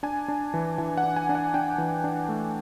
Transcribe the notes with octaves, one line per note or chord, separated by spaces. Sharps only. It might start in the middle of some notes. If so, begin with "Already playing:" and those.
D4 G#5
D4
E3
E3 G#5
F#5
D4
G#5
D4
F#5
D4 G5
E3
D4
A3